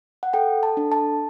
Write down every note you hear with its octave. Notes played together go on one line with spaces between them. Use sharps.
F#5
A4 G5
A5
D4
A5